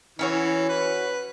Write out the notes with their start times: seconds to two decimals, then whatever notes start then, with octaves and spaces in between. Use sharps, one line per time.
0.19 E3 C#4 F#4 C#5
0.69 B4